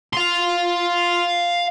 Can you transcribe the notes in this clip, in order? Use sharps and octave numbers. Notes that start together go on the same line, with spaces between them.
F5 C6